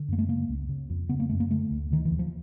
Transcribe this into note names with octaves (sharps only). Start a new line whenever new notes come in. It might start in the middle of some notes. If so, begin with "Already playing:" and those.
Already playing: D3
F#2 A#3
A3
C#3 A#3
C#2
C#3
F2
C#3 B3
A#3
F#2 A3
A#3
D3 A3
D2
D3 D#3
E3
D#2
F3